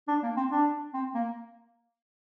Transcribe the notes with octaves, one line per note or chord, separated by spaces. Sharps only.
D4
A#3
C4
D4
C4
A#3